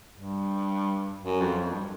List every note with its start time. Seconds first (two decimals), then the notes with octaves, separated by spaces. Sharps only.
0.13 G2
1.23 F#2
1.41 F2
1.60 F2
1.70 G2